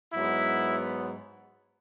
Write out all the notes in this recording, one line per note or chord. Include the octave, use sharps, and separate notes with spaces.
G#2 F#3 B3 E4